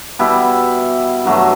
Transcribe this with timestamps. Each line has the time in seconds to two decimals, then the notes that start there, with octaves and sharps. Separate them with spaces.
0.19 B2 G3 E4
1.25 G2 F#3 A3